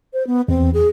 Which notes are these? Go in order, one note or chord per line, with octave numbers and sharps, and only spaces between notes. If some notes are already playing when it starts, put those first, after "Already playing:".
C5
B3
E2 C4
G#4